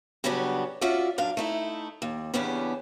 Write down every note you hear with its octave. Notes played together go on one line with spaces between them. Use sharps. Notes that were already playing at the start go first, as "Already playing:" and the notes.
C#3 F#3 G3 B3 C#4 D4
C#4 F4 F#4 D5 E5
F#2 D4 F5
A3 D#4 E4
D#2
E2 C#3 B3 C#4 D4 G4